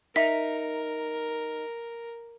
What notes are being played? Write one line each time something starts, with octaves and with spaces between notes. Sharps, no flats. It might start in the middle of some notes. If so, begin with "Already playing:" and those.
D#4 A#4 E5